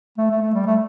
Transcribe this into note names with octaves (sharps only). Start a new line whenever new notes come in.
A3
A3
A3
G3
A3